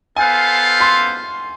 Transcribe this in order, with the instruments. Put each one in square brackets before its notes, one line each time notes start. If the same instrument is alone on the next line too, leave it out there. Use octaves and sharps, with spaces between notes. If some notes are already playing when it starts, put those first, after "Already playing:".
[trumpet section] B3 F4 A4 C5 F5 [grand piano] G#5
[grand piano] C6